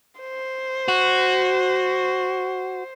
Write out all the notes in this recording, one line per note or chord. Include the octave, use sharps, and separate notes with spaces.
C5
F#4